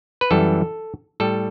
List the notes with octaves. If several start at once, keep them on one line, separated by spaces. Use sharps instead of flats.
B4
F#2 E3 G3 A4
A2 G3 A4